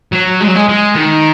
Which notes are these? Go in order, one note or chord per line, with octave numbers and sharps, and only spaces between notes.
F#3
G#3
F#3
G#3
G#3
D#3